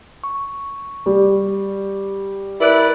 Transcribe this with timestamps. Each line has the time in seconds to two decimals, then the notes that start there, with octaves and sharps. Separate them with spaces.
0.24 C#6
1.06 G3
2.61 E4 A#4 B4 D5 F#6